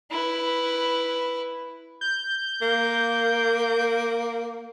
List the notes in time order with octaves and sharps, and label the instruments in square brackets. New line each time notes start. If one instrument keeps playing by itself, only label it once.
[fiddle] E4 B4
[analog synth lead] G6
[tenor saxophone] A#3